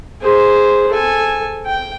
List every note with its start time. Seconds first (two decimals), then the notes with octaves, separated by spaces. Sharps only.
0.22 G#4 C5
0.92 A4 G#5
1.66 G5